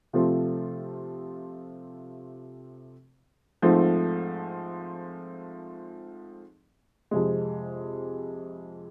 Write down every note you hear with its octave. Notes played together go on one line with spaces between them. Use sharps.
C3 F3 A3 C4 F4
G#2 F3 A3 C4
F2 C3 G#3